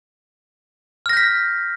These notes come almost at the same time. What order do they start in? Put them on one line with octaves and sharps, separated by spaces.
F6 A#6 G6 B6